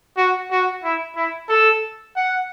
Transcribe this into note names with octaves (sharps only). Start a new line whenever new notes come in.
F#4
F#4
E4
E4
A4
F#5